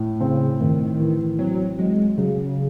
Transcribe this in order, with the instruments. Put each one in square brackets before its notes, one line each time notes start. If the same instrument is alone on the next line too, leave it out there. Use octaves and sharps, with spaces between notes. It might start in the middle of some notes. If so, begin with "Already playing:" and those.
Already playing: [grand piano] A2
[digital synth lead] C#3 [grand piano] C4
[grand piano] A2 [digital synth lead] D#3
[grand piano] E3
[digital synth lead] F#3 [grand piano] C4
[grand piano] F#3 [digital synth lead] G#3
[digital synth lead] C#3 [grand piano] F#3